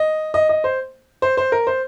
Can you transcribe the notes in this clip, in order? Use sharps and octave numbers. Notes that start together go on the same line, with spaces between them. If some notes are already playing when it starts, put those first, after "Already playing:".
Already playing: D#5
D#5
D#5
C5
C5
C5
A#4
C5